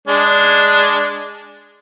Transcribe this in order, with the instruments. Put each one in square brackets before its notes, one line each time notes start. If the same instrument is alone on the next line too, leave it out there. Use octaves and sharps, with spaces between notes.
[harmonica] G#3 D4